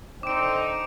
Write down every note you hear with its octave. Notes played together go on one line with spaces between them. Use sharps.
D3 C4 D#4 D6 D7